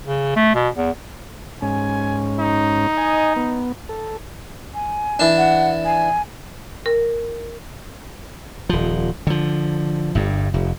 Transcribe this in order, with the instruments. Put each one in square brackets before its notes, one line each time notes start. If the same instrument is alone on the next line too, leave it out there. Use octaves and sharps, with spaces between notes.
[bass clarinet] C#3
A3
B2
E2
[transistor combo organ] G#2 C#4 [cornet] G#5
[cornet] D#4
[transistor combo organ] D#5 G#5
B3
A4
[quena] G#5
[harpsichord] E3 D4
[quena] F#5
G#5
[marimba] A#4
[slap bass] D#1 F3
D3 F3
G1 G2
F1